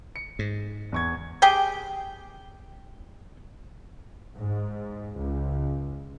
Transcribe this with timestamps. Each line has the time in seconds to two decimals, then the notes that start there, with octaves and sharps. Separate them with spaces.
0.16 C#7
0.39 G#2
0.92 E2 C#6 G#6
1.42 G4 G#4 G5
4.40 G#2
5.19 C#2